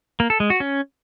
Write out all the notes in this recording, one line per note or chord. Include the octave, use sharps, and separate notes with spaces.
A#3
A4
G#3
F#4
C#4